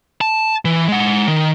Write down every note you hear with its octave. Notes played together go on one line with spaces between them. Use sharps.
A5
E3
G#3 F#5
D#3